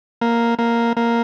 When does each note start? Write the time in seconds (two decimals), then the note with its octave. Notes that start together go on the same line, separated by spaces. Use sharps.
0.21 A#3
0.59 A#3
0.97 A#3